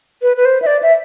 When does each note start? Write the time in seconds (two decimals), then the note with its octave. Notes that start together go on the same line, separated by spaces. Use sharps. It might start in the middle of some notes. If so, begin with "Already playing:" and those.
0.22 B4
0.37 B4
0.45 C5
0.62 E5
0.67 D5
0.83 E5